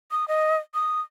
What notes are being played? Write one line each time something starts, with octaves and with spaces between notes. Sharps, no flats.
D#6
D#5
D#6